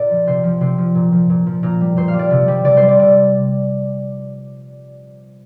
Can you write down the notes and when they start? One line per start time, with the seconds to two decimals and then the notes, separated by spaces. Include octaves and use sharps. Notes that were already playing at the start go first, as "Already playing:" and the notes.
Already playing: A#2 A#4 C5 D5
0.10 F3
0.27 C3 C5
0.43 F3
0.61 C3 C5
0.78 F3
0.95 A#2
1.12 F3
1.30 A#2
1.46 F3
1.63 A#2 A#4
1.81 G3
1.97 A#2 C5
2.08 F5
2.14 G3
2.19 D5
2.31 C3
2.48 G3
2.64 C3 D5
2.77 C5
2.82 G3
2.88 D5
2.99 C3 D5